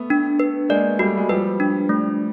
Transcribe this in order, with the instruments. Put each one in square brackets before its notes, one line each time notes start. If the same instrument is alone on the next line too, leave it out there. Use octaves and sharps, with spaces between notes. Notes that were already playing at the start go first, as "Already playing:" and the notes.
Already playing: [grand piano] A3 B3
[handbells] D4
B4
[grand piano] G#3 A#3 [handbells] D5
[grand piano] G3 A3 [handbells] F#4
[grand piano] G#3
[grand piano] F3 G3 [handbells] B4
[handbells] D4
A3